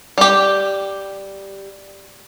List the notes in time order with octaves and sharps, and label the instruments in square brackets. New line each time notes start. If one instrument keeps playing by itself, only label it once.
[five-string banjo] G3 G4